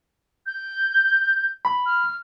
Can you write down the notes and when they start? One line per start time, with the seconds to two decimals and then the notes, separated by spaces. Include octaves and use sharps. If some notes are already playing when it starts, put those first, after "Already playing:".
0.46 G6
1.65 B5
1.86 F6